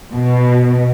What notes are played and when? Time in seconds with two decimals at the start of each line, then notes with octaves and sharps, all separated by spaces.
0.12 B2